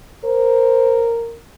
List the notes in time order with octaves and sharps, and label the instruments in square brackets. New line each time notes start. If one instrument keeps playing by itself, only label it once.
[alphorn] A#4 [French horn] C5